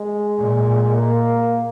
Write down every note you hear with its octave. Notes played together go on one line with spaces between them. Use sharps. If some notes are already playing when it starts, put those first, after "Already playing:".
Already playing: G#3
A#2
A#3